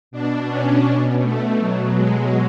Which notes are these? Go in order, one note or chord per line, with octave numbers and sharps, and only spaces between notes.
B2 D4
C#4
B2
A3
B2 F#3
G#3